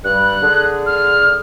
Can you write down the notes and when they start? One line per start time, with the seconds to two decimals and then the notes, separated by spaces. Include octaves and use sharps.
0.04 G2 G3 F#6
0.42 D3 G#4
0.86 F6